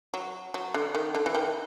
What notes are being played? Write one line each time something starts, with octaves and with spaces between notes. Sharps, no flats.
F#3
F#3
D3
D#3
D3
E3
D#3